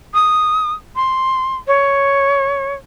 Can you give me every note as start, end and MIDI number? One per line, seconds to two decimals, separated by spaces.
0.14 0.73 87
0.96 1.56 84
1.67 2.73 73